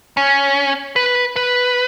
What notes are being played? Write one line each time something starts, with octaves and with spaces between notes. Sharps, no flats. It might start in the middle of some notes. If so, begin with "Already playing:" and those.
C#4
B4
B4